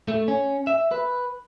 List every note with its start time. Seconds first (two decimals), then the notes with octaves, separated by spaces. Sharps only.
0.08 A3
0.28 C#4
0.67 E5
0.91 B4